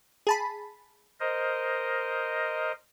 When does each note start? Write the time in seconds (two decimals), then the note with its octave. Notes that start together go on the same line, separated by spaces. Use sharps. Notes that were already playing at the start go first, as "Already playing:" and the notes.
0.27 G#4 A5 B5
1.20 A#4 C5 D#5